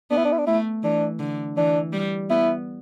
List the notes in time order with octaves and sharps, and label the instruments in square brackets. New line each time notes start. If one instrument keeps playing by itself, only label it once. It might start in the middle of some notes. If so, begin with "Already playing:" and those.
[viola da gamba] B3 [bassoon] D4
[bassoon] E4
D4
E4
D4
[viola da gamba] A3 [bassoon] E4
[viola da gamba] E3 [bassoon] D4
[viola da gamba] D3
[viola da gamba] E3 [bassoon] D4
[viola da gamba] G3
[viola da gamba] B3 [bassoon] E4